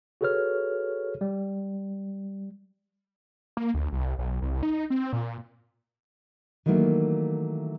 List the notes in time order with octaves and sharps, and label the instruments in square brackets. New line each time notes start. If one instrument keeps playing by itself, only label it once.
[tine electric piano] F#4 G#4 A4 B4 C#5 F6
G3
[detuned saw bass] A#3
D2
C2
B1
C2
D#4
C4
A#2
[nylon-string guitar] D#3 E3 F#3 A3 A#3